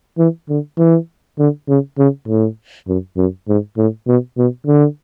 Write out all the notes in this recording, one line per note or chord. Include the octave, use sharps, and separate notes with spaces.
E3
D3
E3
D3
C#3
C#3
A2
F#2
F#2
G#2
A2
B2
B2
D3